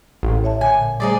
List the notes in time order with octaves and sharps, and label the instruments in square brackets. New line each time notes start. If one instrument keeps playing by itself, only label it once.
[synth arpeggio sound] A1
[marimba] C#5 E5 A5
[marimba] A#2 D3 [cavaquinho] G#5
[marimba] G3 A3 C5 [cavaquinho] D#4 G#4 D5